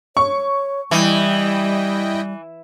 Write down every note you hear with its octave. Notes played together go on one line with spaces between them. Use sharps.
C#5 C#6
E3 G3 E4 D#5 G5